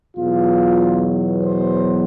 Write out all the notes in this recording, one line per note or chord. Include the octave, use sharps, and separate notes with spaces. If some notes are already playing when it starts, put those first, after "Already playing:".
E2 B2 F#3 F4
C5